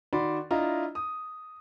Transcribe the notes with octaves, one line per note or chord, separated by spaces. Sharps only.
D#3 F#4 D5 B5 C6
D4 E4 F4 D#5 A#5
D#6